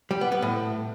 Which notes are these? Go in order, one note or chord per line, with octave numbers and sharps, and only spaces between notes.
G3
B3
B3
A2